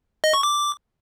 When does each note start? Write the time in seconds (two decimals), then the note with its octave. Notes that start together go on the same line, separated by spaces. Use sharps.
0.24 D#5
0.34 C#6
0.43 D6